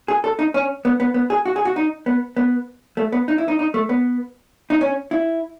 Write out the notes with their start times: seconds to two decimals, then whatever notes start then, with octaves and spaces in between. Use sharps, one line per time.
0.08 G#4
0.24 A4
0.39 D#4
0.54 C#4
0.85 B3
1.00 B3
1.14 B3
1.30 G#4
1.46 F#4
1.56 G#4
1.65 F#4
1.76 D#4
2.06 B3
2.37 B3
2.97 A3
3.12 B3
3.28 D#4
3.38 E4
3.48 D#4
3.59 D#4
3.74 A3
3.89 B3
4.70 D#4
4.81 C#4
5.11 E4